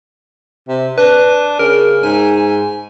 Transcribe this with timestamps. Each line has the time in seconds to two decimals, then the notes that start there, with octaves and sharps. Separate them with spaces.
0.68 C3
0.98 D4 B4
1.59 C#3 A#4
2.03 G#2 G#5